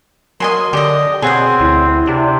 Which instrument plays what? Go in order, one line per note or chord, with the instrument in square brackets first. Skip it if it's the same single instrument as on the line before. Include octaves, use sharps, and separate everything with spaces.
[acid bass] F#3 [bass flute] A#4 [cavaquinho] D#5 G#5 C6
[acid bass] D3 [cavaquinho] G4 D#5 [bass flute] D5
[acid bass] B2 [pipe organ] C4 [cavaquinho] G#4 F#5 G#5 [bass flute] C#5
[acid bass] D2 [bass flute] E4
[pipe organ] C3 [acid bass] D4